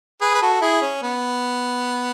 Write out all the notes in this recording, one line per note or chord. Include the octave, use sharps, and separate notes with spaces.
G#4 B4
B4
F#4 A4
E4 G#4
C#4
B3